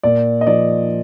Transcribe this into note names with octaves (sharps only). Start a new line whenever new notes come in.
A#2 D5
D#5
F3 D5